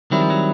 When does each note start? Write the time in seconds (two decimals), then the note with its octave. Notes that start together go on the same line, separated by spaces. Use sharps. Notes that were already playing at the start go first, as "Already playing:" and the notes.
0.11 D#3 F#3 G3 C4 E4
0.20 F3
0.30 F#3